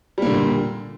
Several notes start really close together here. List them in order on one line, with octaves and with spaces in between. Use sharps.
G3 A#3 D3 A#2